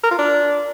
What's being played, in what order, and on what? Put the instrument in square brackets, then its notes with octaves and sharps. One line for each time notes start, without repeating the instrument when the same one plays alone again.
[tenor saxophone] A#4
F4
D4